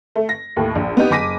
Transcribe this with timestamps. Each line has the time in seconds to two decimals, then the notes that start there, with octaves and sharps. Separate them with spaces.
0.16 A3
0.29 A#6
0.56 D#2 A2
0.75 A#1
0.97 B3 D#4 G4
1.11 F#1 G#5 D6 A#6 B6 D#7